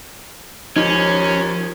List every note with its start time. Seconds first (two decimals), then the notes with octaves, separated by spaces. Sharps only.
0.77 D#2 F3 C#4 D#4